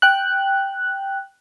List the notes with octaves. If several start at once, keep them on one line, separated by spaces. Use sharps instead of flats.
G5 F#6